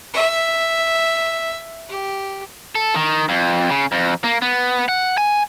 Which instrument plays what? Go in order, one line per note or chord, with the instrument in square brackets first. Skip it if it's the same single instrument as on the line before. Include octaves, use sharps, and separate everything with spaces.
[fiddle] E5
G4
[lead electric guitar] A4
D#3
F2
C#3
F2
A#3
B3
F#5
G#5